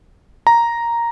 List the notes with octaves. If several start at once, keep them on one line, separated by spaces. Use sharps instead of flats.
A#5